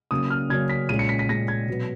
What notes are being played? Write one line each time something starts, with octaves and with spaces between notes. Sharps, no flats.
C#3 F#3 A#3 C#4 D#6
F6
C#3 F#3 A#3 C#4 G#6
B6
A#2 G#3 C#4 D#7
C#7
B6
B6
A#2 G#3 C#4 A#6
G#6
B2 F#3 B3